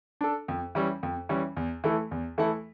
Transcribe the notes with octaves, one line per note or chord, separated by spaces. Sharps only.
D4 A4
F2
E3 G3 C#4
F2
E3 G3 C#4
E2
E3 A3 E4 A4
E2
E3 A3 E4 A4